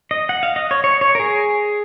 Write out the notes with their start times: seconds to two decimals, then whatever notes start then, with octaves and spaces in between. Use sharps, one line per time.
0.11 D#5
0.29 F#5
0.43 F5
0.56 D#5
0.71 C#5
0.84 C#5
1.01 C#5
1.15 A#4
1.20 G#4